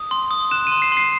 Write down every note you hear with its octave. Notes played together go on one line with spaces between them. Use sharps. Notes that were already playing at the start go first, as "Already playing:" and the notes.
Already playing: D#6
C6
D#6
F#6 E7
C6 D#7
C7
C6 C7